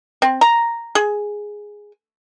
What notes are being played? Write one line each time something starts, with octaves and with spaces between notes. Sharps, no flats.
C4
A#5
G#4